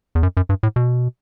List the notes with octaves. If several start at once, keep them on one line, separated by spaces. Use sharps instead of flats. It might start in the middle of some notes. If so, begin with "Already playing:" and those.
E2
F#2
F#2
G2
A2
B2